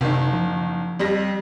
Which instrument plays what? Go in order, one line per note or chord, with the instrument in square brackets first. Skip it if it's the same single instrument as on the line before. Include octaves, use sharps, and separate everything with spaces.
[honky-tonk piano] F#1 D#3 [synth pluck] C3
[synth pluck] F3
[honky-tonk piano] F2 G3 A#6